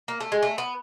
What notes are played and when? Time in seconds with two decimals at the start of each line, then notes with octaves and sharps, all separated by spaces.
0.08 A#3
0.20 A3
0.32 G#3
0.42 A3
0.58 B3